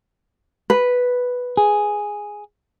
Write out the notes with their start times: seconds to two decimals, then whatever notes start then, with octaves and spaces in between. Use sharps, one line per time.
0.70 B4
1.57 G#4